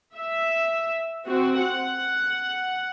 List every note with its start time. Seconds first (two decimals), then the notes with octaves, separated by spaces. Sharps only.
0.15 E5
1.25 C4 F#4
1.61 F#5